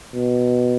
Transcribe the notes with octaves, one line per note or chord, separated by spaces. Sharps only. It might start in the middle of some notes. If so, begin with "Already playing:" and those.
B2